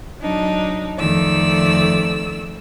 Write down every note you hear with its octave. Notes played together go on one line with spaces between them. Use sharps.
F#3 D4 D#4
F2 D#3 A3 D5 E6